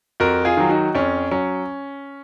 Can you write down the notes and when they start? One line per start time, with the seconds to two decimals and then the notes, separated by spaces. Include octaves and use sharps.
0.20 F2 F#4 A#4
0.45 F4 G#4
0.57 D#3 F#3
0.69 D#4 F#4
0.95 F2 C#4
1.31 F#3 C#4